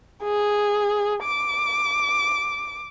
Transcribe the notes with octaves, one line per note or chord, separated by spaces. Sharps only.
G#4
D6